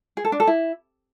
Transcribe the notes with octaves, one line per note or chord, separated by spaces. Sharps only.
G#4
A4
D4
A4
E4